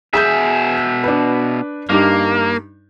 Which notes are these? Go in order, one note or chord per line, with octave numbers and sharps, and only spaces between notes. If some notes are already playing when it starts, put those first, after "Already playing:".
B2 G#4 E5 G#5 G6
D4 B4
G2 A#3 D#4 G4